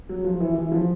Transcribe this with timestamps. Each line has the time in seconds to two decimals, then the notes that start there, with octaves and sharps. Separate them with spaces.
0.09 F#3
0.24 F3
0.40 E3
0.56 E3
0.72 F3